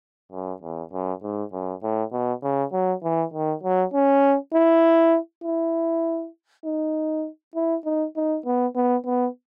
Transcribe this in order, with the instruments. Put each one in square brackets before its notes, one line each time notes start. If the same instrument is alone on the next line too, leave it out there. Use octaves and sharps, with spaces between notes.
[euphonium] F#2
E2
F#2
G#2
F#2
A2
B2
C#3
F#3
E3
D#3
F#3
C#4
E4
E4
D#4
E4
D#4
D#4
B3
B3
B3